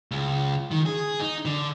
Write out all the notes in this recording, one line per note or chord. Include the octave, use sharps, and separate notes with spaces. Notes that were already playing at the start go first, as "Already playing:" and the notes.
C#2
D#3
G#4
D#4
D3